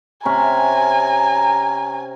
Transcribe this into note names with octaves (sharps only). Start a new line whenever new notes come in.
C3 C#4 G#5 A#5 B5